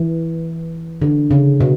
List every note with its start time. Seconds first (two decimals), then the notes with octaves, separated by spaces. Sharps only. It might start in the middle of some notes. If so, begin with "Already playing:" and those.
Already playing: E3
1.02 D3
1.31 C#3
1.60 B2